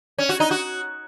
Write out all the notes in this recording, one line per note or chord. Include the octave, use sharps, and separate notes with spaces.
C#4
F#4
D#4
F#4